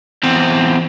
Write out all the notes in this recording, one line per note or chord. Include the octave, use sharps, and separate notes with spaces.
E2 C4